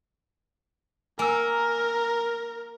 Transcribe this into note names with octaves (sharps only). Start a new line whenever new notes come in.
A#3 A#4 G#5 E6